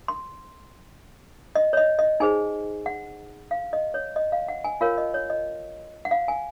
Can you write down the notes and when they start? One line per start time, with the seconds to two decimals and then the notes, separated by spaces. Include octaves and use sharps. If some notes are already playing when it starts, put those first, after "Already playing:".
0.08 C6
1.55 D#5
1.73 C#5
1.77 D#5
1.99 D#5
2.20 D#4 G#4 C5 G#5
2.86 F#5
3.51 F5
3.73 D#5
3.94 C#5
4.16 D#5
4.32 F5
4.48 F#5
4.64 G#5
4.81 F4 A#4 C#5 F5
4.98 D#5
5.14 C#5
5.30 D#5
6.05 F#5
6.11 F5
6.28 G#5